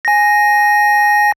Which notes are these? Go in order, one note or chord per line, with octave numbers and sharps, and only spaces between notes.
G#5 A#6